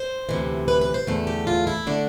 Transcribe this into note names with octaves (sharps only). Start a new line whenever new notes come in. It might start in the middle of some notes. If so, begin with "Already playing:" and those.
Already playing: C5
D2 C3 E3
B4
B4
C5
E2 D3 A3
G4
F4
E4
D3 A3 D4